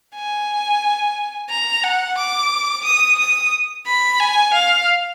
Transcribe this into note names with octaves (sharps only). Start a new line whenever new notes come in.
G#5
A#5
F#5
D6
D#6
D#6
B5
G#5
F5